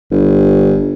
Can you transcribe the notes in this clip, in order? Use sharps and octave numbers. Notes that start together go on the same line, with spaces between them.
G1